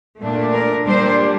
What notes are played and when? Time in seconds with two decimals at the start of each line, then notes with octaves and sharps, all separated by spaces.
0.20 A#2 A3 D4
0.52 A#4
0.85 A#2 G3 D4 C5